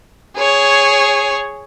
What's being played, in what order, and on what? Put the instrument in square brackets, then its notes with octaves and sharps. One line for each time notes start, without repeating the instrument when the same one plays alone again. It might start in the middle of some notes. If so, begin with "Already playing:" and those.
[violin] G#4 C#5